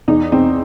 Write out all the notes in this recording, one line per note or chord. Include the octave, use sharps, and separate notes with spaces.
E2 D#4
E2 C4